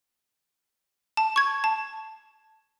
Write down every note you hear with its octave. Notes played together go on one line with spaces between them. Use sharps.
A5
C#6 G#6
A5